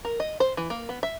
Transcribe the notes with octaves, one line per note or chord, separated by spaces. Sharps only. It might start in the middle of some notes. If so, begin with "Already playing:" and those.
A#4
D#5
C5
E3
A#3
B3
E5